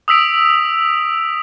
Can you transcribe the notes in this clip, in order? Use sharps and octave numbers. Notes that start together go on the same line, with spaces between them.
D#6 E6 B6 D7 F7